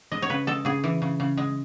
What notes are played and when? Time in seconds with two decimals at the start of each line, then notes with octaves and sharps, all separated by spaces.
0.12 G#3 D#5
0.22 C#5
0.30 C#3 B4
0.47 G#3 A4
0.65 C#3 G#4
0.84 E3
1.02 C#3
1.20 C#3
1.38 G#3